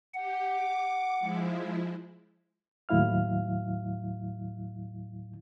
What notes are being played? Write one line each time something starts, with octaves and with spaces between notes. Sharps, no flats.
G4 F#5
D6
F3 G#3 E4
D#2 A2 F#3 E4 F5 F6